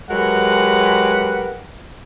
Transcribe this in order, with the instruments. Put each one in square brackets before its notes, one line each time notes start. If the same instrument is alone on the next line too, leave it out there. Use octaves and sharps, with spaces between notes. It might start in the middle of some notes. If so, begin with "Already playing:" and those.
[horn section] F#3 G#3 G4 A#4 B4 F#5